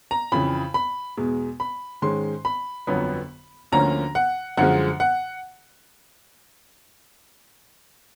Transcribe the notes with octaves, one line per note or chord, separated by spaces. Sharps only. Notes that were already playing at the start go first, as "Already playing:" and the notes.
A#5
F2 C#3 E3 B5
B5
E2 B2 G#3
B5
G#2 D#3 G#3 C#4 C6
B5
G1 F2 D3 F#3 B3
D2 D3 F3 A#3 C#4 A#5
F#5
F#2 D3 F3 G#3 F#5
F#5